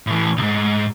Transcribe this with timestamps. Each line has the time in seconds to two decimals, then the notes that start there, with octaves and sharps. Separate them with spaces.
0.07 A2 E3
0.37 C2 G#2